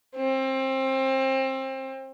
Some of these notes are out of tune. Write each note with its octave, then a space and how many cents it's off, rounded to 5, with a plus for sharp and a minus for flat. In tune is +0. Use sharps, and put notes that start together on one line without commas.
C4 +25